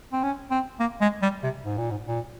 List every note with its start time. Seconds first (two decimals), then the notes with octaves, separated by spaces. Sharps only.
0.13 C4
0.23 C#4
0.50 C4
0.79 A#3
1.01 G#3
1.22 G3
1.43 C3
1.64 G#2
1.78 A#2
1.91 G#2
2.06 A#2